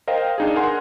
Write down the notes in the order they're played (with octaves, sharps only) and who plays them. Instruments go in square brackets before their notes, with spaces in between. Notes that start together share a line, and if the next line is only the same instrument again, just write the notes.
[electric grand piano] A#4 C5 D#5 F5 G5
D4 D#4 G#4
A#4 F#5 G#5 C6